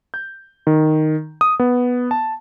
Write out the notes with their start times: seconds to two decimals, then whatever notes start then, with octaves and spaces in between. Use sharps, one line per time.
0.14 G6
0.67 D#3
1.41 D#6
1.60 B3
2.11 A5